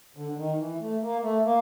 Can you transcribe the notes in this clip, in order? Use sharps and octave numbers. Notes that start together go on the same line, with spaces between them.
D3
D3
D#3
E3
A3
A#3
A3
A#3